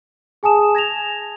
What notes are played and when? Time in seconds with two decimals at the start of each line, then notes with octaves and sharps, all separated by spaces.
0.43 G#4 G#5 A5 D#6 E7
0.75 G#6 A#6 E7 F7